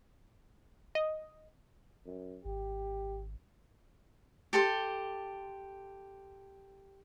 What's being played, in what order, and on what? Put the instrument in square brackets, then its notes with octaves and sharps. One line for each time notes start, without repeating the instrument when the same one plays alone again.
[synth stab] D#5
[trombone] F#2
[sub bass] G#1 [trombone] G4
[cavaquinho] G4 A4 C5 C6